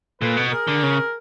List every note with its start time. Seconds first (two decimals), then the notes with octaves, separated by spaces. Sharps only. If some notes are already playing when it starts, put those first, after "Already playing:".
0.21 A#2 A4 B4
0.37 B2
0.52 G#4 A#4
0.68 D3
0.83 C#3